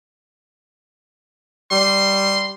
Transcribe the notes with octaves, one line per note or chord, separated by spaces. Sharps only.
G3 C6